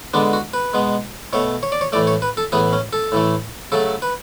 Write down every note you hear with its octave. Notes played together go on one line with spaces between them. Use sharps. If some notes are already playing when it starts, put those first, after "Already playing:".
D3 G#3 B3 D4
F#4
B4
B2 G#3 B3
B2 A3 C#5
C#5
D5
C#5
A2 E3 A3 D5
C#5
B4
A4
A2 E3 B3 G#4
C#4
A4
A2 E3 A3
C#3 F#3 A3 A4
B4